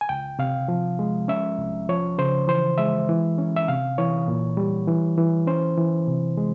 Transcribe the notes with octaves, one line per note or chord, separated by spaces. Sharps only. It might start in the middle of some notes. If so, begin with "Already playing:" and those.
G#5
C#2 G5
C3 F5
F3
G#3
C#4 E5
C2
F3 C#5
C#3 C5
E3 C5
G#3 E5
E3
C#4
E5
C3 F5
E3 C#5
A#2
G3
E3
E3
C#4 C5
E3
C3
G#3